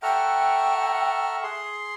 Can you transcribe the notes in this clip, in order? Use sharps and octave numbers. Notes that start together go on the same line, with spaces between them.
A4 E5 F#5 G5 A#5 C#6 F6
G#4 C6